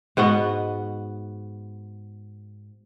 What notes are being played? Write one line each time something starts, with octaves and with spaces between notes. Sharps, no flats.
G#2 B3 F#4 D#5